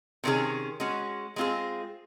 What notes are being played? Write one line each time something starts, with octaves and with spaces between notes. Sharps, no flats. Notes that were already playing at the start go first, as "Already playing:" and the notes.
C3 D#3 G#3 C#4 G#4
G#3 C#4 F#4
G#3 C4 F4 G#4